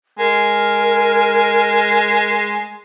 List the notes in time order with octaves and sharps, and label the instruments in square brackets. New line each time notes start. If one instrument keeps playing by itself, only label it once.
[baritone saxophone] G#3 [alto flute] A#4